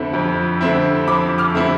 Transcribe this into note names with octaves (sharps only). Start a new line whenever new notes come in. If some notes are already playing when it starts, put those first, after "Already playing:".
Already playing: F2 D3 A3 C4 E4
F2
D3 A3 C4 E4
F2 B5 D6
D6 F6
D3 A3 C4 E4